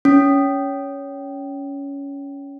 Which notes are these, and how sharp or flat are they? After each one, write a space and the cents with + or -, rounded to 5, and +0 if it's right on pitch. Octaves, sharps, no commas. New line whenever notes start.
C#4 +15